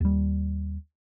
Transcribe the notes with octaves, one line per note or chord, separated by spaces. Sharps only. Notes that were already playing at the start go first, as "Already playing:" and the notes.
D#2 G3